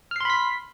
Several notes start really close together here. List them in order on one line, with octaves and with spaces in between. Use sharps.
F6 C7 C6 B5 B6